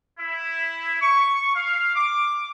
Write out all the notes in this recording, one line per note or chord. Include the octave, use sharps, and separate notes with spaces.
E4
C#6
F5
D6